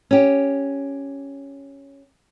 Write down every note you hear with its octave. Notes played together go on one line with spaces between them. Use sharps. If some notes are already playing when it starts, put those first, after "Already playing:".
C#4 G4